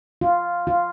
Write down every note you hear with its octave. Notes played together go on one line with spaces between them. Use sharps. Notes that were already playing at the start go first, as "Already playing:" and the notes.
F4
F4